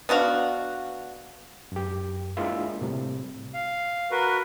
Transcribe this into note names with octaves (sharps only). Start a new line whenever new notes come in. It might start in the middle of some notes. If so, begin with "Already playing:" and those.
B3 D4 F#4 F5
F#2 G4
G#3 A#3 D4 E4 F4 E5
A2 C3 G3
F5
F#4 A#4 B4